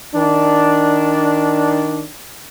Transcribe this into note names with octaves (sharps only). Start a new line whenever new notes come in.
D#3 D4